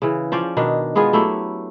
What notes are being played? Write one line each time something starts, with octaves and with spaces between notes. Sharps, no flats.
C#3 E3
F3 C#4 C5 D5
B2 D#3 D4
G#3 B3 F4 G#4
F#3 A3 E4 G4